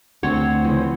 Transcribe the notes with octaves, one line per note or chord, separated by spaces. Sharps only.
D2 C4 C#5 F#5
C#3 E3 F3